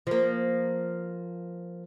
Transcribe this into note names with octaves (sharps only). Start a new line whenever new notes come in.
F3 A#3